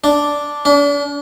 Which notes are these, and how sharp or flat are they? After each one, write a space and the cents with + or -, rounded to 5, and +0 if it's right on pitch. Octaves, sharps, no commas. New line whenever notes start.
D4 -5
D4 -40